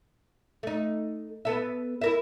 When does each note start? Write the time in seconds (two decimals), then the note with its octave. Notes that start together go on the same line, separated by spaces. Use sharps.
0.63 A3 D#4
1.45 B3 A4 E5
2.01 E4 A#4 E5